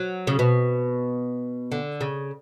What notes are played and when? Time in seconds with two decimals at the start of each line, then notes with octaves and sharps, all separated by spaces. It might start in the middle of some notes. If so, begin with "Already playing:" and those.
Already playing: F#3
0.27 C#3
0.39 B2
1.72 D3
2.01 C#3